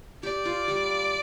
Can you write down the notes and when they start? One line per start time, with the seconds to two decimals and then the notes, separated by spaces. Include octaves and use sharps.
0.23 G4 D5
0.45 F4
0.68 G3